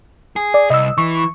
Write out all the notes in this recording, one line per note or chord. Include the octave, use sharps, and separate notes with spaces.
G#4
D5
C2 D#5 E6
E3 C#6